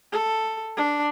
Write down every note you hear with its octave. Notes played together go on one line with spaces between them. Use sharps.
A4
D4